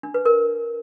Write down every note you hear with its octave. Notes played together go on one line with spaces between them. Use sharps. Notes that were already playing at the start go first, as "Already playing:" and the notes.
D4
B4
A#4